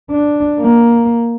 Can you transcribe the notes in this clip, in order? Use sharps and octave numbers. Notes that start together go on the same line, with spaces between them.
D4
A#3